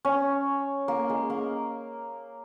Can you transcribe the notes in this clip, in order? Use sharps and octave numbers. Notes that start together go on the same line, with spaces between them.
C#4
A#3
G#3
A#3